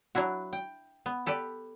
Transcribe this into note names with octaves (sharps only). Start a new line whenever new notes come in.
F#3 D4 E4 F#4
G5
B3
G4 A4 B4 D5